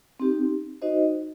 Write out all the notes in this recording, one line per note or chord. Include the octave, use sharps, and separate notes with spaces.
C4 D#4 G4
D#4 F#4 C5 D#5